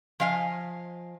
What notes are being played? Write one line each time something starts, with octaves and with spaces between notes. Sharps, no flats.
F3 D#5 F5 G5 G#5